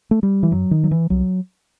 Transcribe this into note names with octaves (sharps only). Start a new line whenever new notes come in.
A3
G3
E3
F#2 F#3
D#3
F#3
E3
C2 F#3